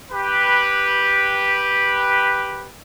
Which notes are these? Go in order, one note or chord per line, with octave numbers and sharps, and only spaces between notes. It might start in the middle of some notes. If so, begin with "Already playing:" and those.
G4 B4